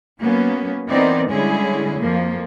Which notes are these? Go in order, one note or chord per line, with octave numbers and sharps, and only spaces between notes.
F#3 A#3 B3 C#4
E3 B3 C4 D#4 A#4 D5
D3 G3 G#3 C#4 E4 G#4
F2 F3 A#3